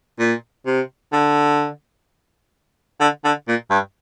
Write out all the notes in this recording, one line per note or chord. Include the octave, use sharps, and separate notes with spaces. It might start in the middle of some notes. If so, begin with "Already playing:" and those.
A#2
C3
D3
D3
D3
A#2
G2